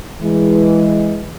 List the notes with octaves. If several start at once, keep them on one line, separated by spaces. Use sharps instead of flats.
E3 G#3